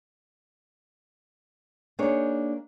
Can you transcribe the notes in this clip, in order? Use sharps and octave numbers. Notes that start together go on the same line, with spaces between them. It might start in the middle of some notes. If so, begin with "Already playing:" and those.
A#3 D4 D#4 G#4 C#5